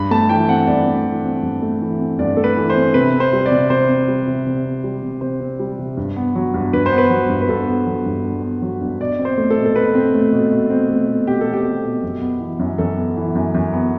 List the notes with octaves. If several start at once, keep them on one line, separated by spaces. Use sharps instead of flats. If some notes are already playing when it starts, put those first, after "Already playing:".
Already playing: G2 B5
A3 A5
E3 G5
C4 F#5
G2 D5
A3
E3
C4
G2
A3
E3
C4
G2 D5
A3 A4
B4
E3
C5
C4
C3 B4
C4
C5
G3
D5
C3
C3 C5
C4
G3
C3
C3
C4
G3
C3
C3 C5
C4
G3
C3
G2
B3
F#3
G2
G2 B4
C5
B3
B4
F#3
G2
B4
G2 A4
B3
F#3
G2
G2
B3
F#3
G2
B2 D5
C4
C5
A3
A4
B2
A4
B2 B4
C4
A3
B2
B2
C4
A3
B2
B2 G4
A4
C4
G4
A3
B2
F#2
B3
E3
F#2
F#2 A4
B3
E3
F#2
F#2
B3